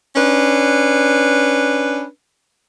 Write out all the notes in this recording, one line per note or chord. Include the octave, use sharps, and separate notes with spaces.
C#4 D4 B4